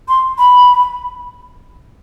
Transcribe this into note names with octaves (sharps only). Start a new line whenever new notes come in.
C6
B5